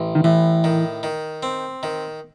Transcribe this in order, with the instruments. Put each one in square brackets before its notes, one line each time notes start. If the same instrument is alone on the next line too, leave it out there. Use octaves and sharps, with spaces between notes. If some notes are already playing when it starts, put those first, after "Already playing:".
Already playing: [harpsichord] A1
[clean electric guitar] D#3
[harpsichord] A2 [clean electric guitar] E3
[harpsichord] D#3
D#3
C4
D#3